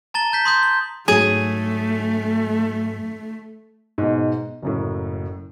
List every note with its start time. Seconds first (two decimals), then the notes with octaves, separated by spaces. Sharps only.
0.14 A5 A#5 A6 G7
0.33 G6 B6
0.45 C6 D#6 G6
0.63 G6
1.08 G#2 F#3 A3 G#4
3.98 G#2 B2
4.62 F#1 F#2 A2